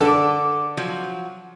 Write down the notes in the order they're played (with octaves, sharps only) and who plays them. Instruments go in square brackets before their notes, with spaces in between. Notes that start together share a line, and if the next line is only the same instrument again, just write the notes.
[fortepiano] D3 A4 [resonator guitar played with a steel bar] B4 D5
[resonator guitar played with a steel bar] F3 F#3